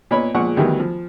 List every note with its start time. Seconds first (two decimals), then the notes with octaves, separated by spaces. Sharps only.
0.11 A#2 B3 C#5 D#5 B5
0.35 A#2 F3 G#3 F#5 C#6
0.57 D2 D#3 E3 F#3 G3 B3
0.80 F3